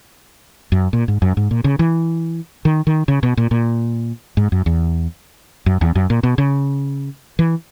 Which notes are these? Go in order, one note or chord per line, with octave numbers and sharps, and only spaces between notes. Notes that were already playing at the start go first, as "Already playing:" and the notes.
F#2
A#2
G#2
F#2
G#2
A#2
C#3
E3
D#3
D#3
C#3
B2
A#2
A#2
G#2
F#2
E2
F#2
E2
F#2
A#2
B2
C#3
E3